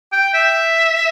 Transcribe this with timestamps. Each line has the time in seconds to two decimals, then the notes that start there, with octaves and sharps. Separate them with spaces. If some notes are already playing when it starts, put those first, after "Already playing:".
0.12 G5
0.34 E5